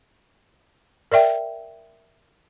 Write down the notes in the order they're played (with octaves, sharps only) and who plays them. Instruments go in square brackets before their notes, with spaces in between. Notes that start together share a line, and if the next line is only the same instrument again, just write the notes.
[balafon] A#4 D5 E5 G5